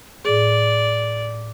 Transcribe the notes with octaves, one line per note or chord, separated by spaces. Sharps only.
A2 G#4 D5